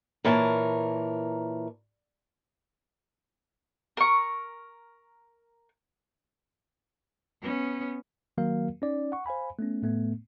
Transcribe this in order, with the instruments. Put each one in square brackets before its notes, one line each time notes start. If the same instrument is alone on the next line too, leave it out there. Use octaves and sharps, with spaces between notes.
[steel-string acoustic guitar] A#2 E3 A#4 C#5 A5
[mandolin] A#4 C#6
[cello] B3 C#4
[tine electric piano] D#3 F#3 A#3 F#4 A#4 F5
C#4 D#4 D5
F#5 C#6
C5 F5 G#5 B5
A3 B3 C#4
A2 A3 B3